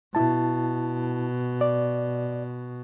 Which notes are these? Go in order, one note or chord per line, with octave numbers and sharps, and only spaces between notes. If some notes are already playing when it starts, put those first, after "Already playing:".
B2 E4 A5
D5